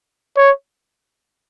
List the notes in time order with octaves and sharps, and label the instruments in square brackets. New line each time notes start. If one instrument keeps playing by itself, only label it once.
[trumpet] C#5